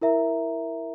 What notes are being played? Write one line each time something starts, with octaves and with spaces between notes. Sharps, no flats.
E4 A#4 E5 A#5